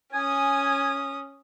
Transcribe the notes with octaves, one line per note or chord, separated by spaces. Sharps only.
C#4 G#5 D#6